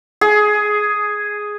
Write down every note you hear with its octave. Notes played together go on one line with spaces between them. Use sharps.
G#4